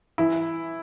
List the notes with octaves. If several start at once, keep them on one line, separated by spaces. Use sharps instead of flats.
E3 E4